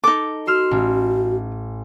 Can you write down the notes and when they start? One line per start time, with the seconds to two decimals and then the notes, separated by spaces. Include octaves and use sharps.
0.04 D#4 A4 D6
0.47 F#4 C6 E6 F6
0.71 A1